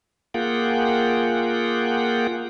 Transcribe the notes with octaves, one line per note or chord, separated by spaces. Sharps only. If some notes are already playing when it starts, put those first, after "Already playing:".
A#3 F4 G#4 F#5 G5